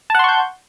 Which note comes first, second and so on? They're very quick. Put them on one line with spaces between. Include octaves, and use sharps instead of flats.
A5 F#5 C6 C#6 G6